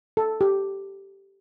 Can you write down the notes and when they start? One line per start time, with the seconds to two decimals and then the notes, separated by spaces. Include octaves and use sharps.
0.17 A4
0.41 G4